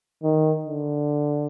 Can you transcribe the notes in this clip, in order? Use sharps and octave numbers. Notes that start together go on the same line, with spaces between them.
D#3
D3